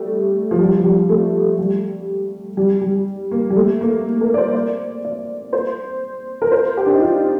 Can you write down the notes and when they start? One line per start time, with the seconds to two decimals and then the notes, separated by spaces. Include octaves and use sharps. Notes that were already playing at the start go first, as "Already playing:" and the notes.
Already playing: G3 A3
0.51 F3
0.60 G3
0.78 F3
0.84 G3
1.09 A3
1.59 G3
2.57 G3
2.81 G3
3.31 A#3
3.50 G3
3.56 A3
3.81 A#3
4.21 A#4
4.34 D5
4.38 C5
4.54 D5
5.05 D5
5.53 C5
6.42 A#4
6.51 C5
6.77 G4
6.86 D4
6.94 D#4
7.02 F4